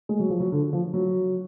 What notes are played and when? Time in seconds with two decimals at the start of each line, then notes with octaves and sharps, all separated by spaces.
0.09 G#3
0.19 F#3
0.30 F3
0.40 F#3
0.52 D3
0.73 F3
0.94 F#3